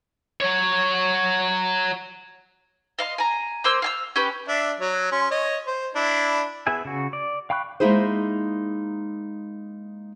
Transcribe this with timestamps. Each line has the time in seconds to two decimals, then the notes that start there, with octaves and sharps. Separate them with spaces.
0.41 F#3 C#5
2.99 D#5 F5 C6
3.18 G#5 A#5
3.64 A#3 C5 C6 E6
3.82 F5 G#5 E6
4.16 C#4 G4 B4
4.48 D4 E5
4.80 F#3 C#5
5.12 C#4 C6
5.31 C#5 D#5
5.67 C5
5.95 D4 E4
6.67 B3 E4 G#4 E5 G#5
6.85 C#3 F#4
7.13 D5
7.50 F5 G5 B5 C#6 F#6
7.80 G#3 A#3 D#4 E4 G#4 C5